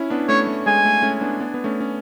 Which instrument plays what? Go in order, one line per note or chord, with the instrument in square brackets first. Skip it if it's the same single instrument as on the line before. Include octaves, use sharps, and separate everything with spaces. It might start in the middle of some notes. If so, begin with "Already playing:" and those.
Already playing: [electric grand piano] C#4 E4
B3 D4
[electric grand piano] A3 C#4 [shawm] C#5
[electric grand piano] A3
[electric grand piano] G#3 [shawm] G#5
[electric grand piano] A3
A3 C#4
B3 D4
B3 D4
B3
A3 C#4
C#4